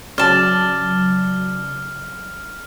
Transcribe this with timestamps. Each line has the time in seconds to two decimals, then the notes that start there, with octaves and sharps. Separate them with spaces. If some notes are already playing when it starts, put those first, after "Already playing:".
0.18 C#3 F#3 D5 A5 F6